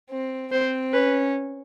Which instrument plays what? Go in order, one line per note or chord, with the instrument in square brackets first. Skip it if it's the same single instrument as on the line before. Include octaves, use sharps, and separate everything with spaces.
[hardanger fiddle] C4
[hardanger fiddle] C4 [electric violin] C5
[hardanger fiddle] C#4 [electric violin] B4